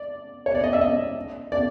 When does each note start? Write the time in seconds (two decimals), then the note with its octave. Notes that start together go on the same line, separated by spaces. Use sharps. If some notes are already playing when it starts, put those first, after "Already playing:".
Already playing: D5
0.46 C#5
0.55 D5
0.64 D#5
0.73 E5
0.81 D#5
1.52 D5